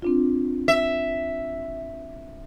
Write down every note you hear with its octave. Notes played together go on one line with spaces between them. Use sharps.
C4 D4 F4
E5